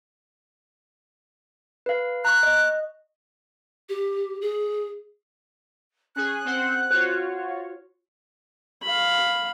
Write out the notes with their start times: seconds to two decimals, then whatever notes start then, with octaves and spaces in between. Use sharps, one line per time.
1.86 B4 F5
2.25 A#5 C#6 F#6
2.43 D#5
3.89 G4
4.41 G#4
6.16 C#4 G#4 F#6
6.45 C4 C5 F#5
6.91 F4 F#4 C5 C#5
8.83 F5 B5